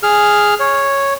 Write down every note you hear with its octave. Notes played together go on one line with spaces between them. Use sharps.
G#4 F6
C#5